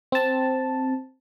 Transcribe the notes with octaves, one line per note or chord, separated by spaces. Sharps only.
C4 A5